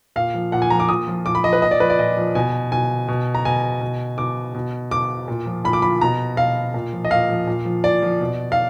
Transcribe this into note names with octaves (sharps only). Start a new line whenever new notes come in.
A#2 F5
F3
A#2 F#5
G#5
F3 A#5
D6
A#2 D#6
F3
A#2 D6
B5
F3 D#5
B4
A#2 D#5
D5
F3 B4
D5
A#2 D#5
F3
B2 G#5
B2 G#5
B2
A#5
B2 G#5
B2
B2 D6
B2
B2 D6
A#2
F3
A#2 B5
D6
F3 B5
B2 A#5
B2 F5
A#2
F3
D#5
A#2 F5
F3
A#2
F3
A#2 D5
F3
B2
F5